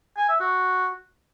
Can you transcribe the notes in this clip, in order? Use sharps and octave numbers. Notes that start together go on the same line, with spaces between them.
G#5
E5
F#4